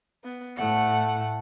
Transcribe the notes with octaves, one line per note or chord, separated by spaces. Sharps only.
B3
A2 A3 F#5